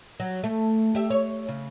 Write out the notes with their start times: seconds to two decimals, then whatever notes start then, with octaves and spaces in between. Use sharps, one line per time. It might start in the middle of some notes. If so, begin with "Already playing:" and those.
0.20 F#3
0.44 A3
0.95 G4 E5
1.10 C#5
1.48 C#3